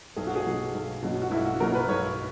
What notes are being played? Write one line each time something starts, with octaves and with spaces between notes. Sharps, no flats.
B1 G#4
F#4
G#4
B2 F#3
B1
B2 F#3
F#4
B1 E4
F#4
B2 F#3 A#4
B4
B1 C#5